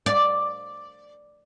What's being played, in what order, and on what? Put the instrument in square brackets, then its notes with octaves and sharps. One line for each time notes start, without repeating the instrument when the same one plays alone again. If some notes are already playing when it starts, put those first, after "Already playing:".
[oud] D5